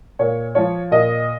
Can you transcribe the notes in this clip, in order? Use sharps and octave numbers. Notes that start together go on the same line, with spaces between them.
A#2 C#5
F3 C#5
A#2 D#5